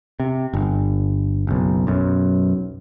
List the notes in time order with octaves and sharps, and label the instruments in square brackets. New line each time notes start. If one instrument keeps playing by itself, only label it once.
[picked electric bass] C3
G1
F#1 B1
B1 F#2